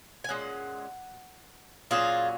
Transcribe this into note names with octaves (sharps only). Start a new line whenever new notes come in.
G#5
A#2 G#3 C#4 F#5
A#2 F#3 C#4 F4 G#4